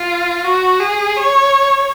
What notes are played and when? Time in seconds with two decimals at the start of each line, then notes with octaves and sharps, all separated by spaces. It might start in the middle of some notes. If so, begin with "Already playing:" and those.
Already playing: F4
0.44 F#4
0.80 G#4
1.16 C#5